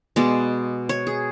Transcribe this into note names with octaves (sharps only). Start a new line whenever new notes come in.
B2 G#3 B3 D5
C#5
G#4